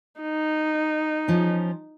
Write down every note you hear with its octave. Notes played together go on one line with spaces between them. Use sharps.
D#4
F3 C#4